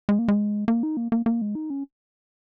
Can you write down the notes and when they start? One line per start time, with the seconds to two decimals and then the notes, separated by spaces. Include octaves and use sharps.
0.09 G#3
0.19 A#3
0.28 G#3
0.68 A#3
0.83 D#4
0.97 A#3
1.12 A#3
1.26 A#3
1.42 G#3
1.55 D#4
1.70 C#4